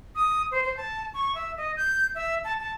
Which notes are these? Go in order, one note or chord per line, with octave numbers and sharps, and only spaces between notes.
D#6
C5
C5
A5
C#6
E5
D#5
G6
E5
A5
A5